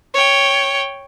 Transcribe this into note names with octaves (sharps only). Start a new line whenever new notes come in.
C#5 G5